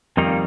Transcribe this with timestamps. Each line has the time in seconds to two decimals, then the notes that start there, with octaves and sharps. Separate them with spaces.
0.17 F2 D#3 G3 A#3 D#4